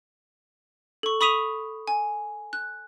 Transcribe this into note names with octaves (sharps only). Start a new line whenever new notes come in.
A4 C#6
B5 C#6 D#6 B6 D#7 F7
G#5
F#6